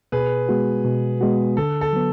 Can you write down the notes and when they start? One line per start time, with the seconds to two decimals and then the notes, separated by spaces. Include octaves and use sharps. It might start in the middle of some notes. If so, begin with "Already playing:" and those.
0.12 B2 G#4 B4
0.49 G#3 B3 F#4
0.85 B2
1.21 G#3 B3 F#4
1.57 D3 A4
1.81 A4
1.93 F#3 B3